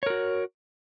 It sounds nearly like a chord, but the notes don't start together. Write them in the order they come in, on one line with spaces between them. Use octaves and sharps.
C#5 A#4 F#4